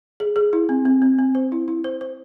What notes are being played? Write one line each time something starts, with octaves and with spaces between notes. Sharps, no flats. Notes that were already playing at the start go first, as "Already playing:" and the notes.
G#4
G#4
E4
C4
C4
C4
C4
C5
E4
E4
C5
C5